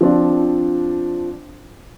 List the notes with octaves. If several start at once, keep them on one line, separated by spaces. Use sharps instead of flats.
F3 C4 D4 F4